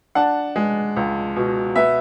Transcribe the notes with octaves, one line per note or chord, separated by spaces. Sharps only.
D4 F#5 A5
G#3
C#2
B2
B3 E5